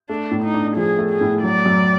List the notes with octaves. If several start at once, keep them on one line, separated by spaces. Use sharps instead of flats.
A3 D4
A2
D#4
D4
F3 G#4
A3
G#4
A2
F#3 D5
F#2